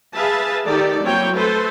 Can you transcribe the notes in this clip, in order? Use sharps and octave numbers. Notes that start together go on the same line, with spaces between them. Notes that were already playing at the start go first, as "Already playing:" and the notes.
G#4 B4 E5 F5 A5
D#3 A3 D#4 G4 A4 D5
F#3 A#3 C4 E4 C#5 G5
A3 A4 B4 C5